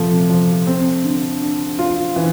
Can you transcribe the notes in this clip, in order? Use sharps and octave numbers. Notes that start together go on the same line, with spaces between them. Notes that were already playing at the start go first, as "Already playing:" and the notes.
Already playing: C3 F3 A3
F3
C4
D3
D3
F4
E3